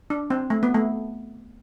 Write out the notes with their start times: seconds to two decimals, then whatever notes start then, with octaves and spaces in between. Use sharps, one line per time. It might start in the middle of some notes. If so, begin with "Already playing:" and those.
0.10 D4
0.30 C4
0.50 A3
0.63 B3
0.74 A3